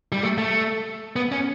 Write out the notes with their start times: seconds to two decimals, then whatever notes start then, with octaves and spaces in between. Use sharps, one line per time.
0.12 G3
0.23 A3
0.38 A3
1.16 B3
1.32 C#4